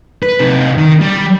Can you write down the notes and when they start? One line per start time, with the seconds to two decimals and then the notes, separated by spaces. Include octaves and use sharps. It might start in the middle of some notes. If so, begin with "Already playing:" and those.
0.23 B4
0.40 C3 D#4
0.77 D#3
1.01 G3